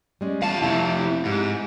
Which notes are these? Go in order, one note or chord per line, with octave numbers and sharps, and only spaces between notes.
G3 G#3 C#4
E2 F4 F5 A5
F2 C3 E4
E4
G#2 G#3 G4